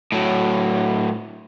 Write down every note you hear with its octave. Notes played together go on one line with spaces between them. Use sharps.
A2 F#3